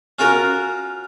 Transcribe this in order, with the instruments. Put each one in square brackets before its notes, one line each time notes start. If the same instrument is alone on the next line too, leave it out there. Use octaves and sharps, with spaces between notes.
[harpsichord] C#4 F4 F#4 A#4